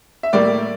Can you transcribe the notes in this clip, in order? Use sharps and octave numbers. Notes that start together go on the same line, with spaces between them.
E5
A2 G3 A#3 D5